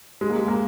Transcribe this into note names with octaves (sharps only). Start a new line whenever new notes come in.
G#3
A#3
G#3
A#3